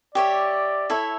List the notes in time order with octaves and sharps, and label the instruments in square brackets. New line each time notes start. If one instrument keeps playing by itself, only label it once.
[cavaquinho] G4 C#5 E5 [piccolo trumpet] D5
[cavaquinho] E4 A4 C#5 E5